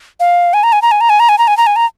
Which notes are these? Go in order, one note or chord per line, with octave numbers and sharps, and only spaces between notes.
F5
G#5
A#5
G#5
A#5
G#5
A#5
G#5
A#5
G#5
A#5
G#5
A#5
G#5
A#5